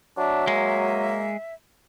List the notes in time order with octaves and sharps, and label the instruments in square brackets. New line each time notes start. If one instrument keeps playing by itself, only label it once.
[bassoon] F#3 [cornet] D4 [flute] E5
[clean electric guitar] G#3 [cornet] A#3